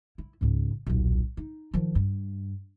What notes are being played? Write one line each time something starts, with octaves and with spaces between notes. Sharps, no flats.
E4
C#2 G#2
D#1 B1
D#4
D#3 F3
G2